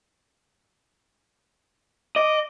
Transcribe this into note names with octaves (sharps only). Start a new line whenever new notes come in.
D#5 D6